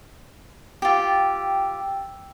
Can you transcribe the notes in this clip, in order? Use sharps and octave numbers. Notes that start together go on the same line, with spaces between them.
F4 G4 G5 E6